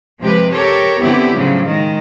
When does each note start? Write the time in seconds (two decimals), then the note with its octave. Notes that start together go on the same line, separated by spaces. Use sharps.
0.22 C3 F3 G#3 G4 B4
0.54 G4 A4 A#4 C#5
1.01 D3 B3 C4 E4 G4
1.34 A2 C#3 F3 F#3
1.65 D#3 G#3